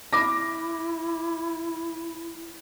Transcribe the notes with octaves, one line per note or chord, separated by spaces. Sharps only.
E4 B5 D6 A#6